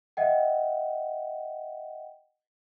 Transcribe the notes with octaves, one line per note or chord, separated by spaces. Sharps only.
D#5 E5 F#5 G5